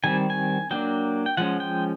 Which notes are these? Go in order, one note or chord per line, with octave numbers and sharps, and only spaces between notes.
D#3 G3 C4 G#5
G#5
F#3 A#3 D4 G5
G5
F3 G#3 C#4 F#5
G5